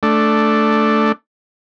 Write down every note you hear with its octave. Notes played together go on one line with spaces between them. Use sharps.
A3 D4